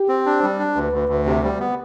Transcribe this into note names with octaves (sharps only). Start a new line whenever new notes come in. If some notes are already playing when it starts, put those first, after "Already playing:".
Already playing: G4
C4
D4
G3
D4
D2 B4
D2
D2
C3
G3
B3